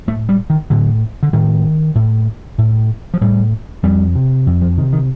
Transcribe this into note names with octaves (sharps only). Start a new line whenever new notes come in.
A2 A3
G3
D#3
A2 D3
D3
A2 D#3
A2
A2
F3
A2 G3
F2 G3
C3
F2
F3
C3 D#3
D#3